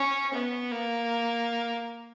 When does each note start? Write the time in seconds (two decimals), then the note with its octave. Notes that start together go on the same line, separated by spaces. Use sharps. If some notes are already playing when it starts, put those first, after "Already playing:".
Already playing: C#4
0.33 B3
0.71 A#3